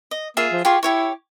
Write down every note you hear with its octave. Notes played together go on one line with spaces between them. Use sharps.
D#5
A#3 F4 G#4 E5
F3
F4 G4 G#4 C#6
E4 G4 C#5 C#6